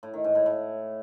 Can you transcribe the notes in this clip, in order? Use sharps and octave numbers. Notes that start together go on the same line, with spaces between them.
A2
D#3
G#2
A2
A2